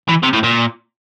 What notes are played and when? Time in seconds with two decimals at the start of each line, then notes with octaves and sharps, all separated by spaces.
0.09 E3
0.23 C3
0.33 A2
0.44 A#2